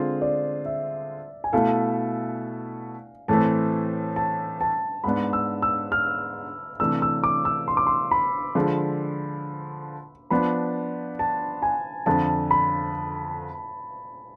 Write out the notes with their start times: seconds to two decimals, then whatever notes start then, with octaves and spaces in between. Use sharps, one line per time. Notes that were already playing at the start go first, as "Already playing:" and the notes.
Already playing: D3 G#3 C4 F4 G#4
0.22 D5
0.66 E5
1.44 G#5
1.53 B2 A3 E4 A4 F5
3.28 A2 E3 A3 C4 A5
4.16 A5
4.61 A5
5.04 G#2 G#3 B3 D4 B5
5.33 E6
5.62 E6
5.92 F6
6.80 C3 E3 A3 D4 E6
7.02 E6
7.24 D6
7.45 E6
7.68 C6
7.77 D6
7.87 C6
8.11 B5
8.55 D3 F3 G#3
10.30 F3 B3 D4 B5
11.19 A5
11.62 G#5
12.06 F2 D3 F3 A5
12.51 B5